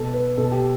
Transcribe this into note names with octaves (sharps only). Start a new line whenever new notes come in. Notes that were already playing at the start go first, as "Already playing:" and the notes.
Already playing: B2 A4
B4
B2 A4
G4